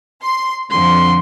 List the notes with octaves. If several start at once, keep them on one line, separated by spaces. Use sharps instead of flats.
C6
F2 D3 C6